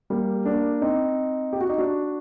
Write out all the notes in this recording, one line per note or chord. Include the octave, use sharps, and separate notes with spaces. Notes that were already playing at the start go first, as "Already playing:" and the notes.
G3 A#3
A#3 D4
C4 D#4
G4
F#4
D#4
D4 F#4